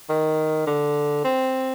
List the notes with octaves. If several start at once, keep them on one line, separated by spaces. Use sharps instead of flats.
D#3
D3
C4